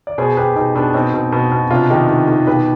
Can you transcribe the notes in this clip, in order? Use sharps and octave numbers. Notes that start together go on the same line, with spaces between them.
D5
B2 G#4 C5
B2 G4 B4
B2 D#4 G4
B2 D4
B2 C4 D#4
B2
B2
B2
C3 D4 F4
D#3 D#4 G4
D#3
D#3
B2 G4 B4